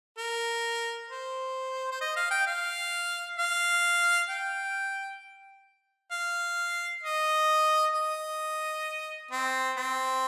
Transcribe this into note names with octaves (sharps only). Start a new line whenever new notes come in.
A#4
C5
C5
D#5
F5
G5
F5
F5
G5
F5
D#5
D#5
C4
C4